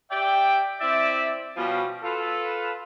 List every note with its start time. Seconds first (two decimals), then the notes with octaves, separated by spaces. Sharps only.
0.11 G4 D5 E5 G5
0.81 C4 E4 D5 E5
1.57 B2 F3 G3 C#4
2.03 F4 A4 B4